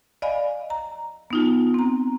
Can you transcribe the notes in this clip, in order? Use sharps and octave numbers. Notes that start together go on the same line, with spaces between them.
D5 D#5 F5 G#5 B5
A#5
B3 D#4 F4
C4 A#5